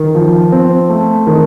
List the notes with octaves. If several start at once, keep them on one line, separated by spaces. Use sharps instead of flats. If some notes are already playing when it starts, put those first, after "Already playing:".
Already playing: D#3
F3
C4
A3
D#3